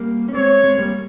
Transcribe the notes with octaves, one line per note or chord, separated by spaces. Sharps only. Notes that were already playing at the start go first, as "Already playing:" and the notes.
Already playing: G3 A#3
C#4
G#3 C4 C#5
G#3 C4
G3 A#3